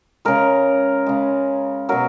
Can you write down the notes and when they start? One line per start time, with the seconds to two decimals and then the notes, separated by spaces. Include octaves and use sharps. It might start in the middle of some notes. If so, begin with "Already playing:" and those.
0.25 C#3 G#3 A#4
1.06 C#3 G#3
1.89 B2 F#3 A#4